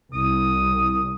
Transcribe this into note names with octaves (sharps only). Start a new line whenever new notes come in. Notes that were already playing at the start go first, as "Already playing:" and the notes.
C2 D#6